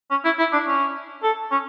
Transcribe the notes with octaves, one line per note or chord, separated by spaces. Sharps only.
C#4
E4
E4
D4
C#4
A4
C#4